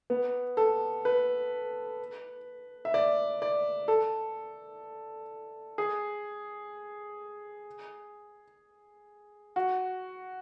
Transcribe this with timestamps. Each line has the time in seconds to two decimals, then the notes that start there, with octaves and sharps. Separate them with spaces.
0.10 B3
0.57 A4
1.05 B4
2.85 E5
2.94 D5
3.42 D5
3.88 A4
5.78 G#4
9.56 F#4